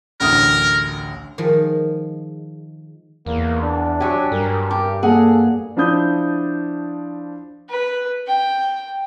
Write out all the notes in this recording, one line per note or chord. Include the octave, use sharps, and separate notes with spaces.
A1 D2 A#4 D#6
D#3 F3 G#3
E2 A#3
D4
F#3 G4 G#5 C#6
G2 A#4
G4
A#3 G#4 A4 F#5
F3 D4 E4 D#6 G6
B4
G5